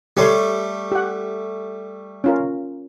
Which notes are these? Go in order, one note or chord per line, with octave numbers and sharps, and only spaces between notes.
G3 A3 G4 C#5 C6
G4 F#5
C#4 F4 A#4